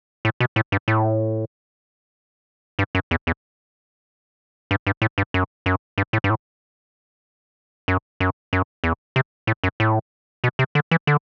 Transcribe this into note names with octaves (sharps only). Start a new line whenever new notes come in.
A2
B2
A2
G2
A2
G2
F#2
E2
E2
G2
G2
A2
G2
F#2
F#2
G2
A2
G2
A2
F#2
F#2
F#2
E2
C3
A2
F#2
A2
B2
C3
D3
E3
D3